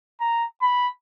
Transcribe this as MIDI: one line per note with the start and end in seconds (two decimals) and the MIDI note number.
0.21 0.46 82
0.62 0.89 83